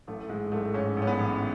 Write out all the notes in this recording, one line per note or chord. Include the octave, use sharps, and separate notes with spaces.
A1 A3
G#2 G#3
A1 A3
G#2 C#4
A1
C#4
B3
A1